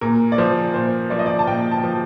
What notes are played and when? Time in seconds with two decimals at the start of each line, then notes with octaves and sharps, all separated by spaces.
0.01 A#2 A#4
0.32 D5
0.38 F3 C5
0.74 A#2 C5
1.10 F3 D5
1.19 D#5
1.26 D5
1.39 A5
1.47 A#2 G5
1.71 A5
1.84 F3